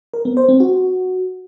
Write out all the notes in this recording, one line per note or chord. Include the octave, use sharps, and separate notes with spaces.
A#4
B3
C5
C4
F#4